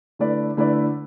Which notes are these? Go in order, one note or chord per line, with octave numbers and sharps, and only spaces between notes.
D3 A3 E4 B4 D5
D3 A3 E4 B4 D5